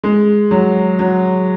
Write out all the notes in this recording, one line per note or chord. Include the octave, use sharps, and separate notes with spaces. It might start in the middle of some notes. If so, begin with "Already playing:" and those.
G#3
F#3
F#3